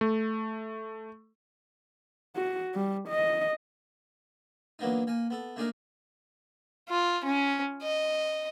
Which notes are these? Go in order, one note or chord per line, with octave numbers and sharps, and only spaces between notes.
A3
F#4
G3
D#5
E3 F#3 A#3 B3 D4 D#4
A#3 G#5
B3 A4
A3 A#3 D4 D#4 G#4 A#4
F4
C#4
D#5